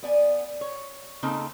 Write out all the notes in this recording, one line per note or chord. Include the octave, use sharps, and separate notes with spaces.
B3 D5 G#5
C#5
C#3 A#3 C4 D#4 A4